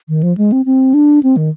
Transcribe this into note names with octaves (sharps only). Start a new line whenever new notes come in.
D#3
F3
G#3
C4
C4
D4
C4
D#3